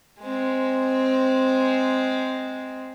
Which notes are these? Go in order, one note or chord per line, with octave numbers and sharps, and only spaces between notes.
G#3 C4